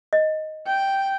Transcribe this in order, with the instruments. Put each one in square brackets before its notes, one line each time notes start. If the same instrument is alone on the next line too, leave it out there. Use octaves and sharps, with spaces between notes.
[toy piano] D#5
[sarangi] G5